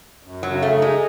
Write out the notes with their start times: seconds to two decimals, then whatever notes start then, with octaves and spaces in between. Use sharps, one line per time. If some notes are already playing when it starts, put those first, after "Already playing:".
0.23 F#2
0.43 F#3
0.49 C#3
0.62 A3
0.76 D#4
0.82 G#3